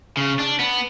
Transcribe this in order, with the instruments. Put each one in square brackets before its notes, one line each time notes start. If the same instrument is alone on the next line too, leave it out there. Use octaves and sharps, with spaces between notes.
[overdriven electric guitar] C#3
D4
B3